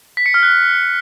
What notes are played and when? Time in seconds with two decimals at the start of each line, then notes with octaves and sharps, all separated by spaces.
0.17 B6
0.26 C#7
0.34 F6
0.43 F#6